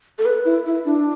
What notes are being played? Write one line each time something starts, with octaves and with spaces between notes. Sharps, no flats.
A4
B4
E4
E4
D4